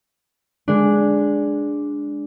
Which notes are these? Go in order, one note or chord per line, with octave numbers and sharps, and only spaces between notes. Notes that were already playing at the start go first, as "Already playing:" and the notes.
G#3 D4